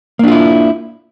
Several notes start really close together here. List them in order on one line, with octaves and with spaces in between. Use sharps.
A#3 D4 F4 E4